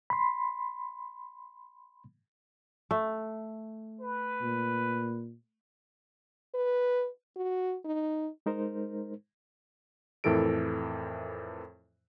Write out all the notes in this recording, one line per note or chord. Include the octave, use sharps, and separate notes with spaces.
B5 C6
A3
B4
A#2
B4
F#4
D#4
G#3 D#4 A#4 C5
F2 A2 E3 A4 A#4 D7